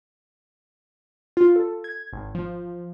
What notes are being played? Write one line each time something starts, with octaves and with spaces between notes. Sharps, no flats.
F4
A4
G#6
G#1
F3